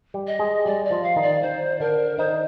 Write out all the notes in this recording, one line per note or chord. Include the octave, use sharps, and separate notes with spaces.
G3 G4
D#5
G#3 G#4
G3 G4 D5
D5
F3 F4
F5
D#3 D#4
D5
C5
D3 D4 A#4
D#3 D#4 C5